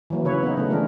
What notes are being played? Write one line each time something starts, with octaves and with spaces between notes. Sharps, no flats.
E3 F#3 A#3
C#3 E4 B4 C#5
B3 D#4
C#3 A3
E3 G#3 D4 A#4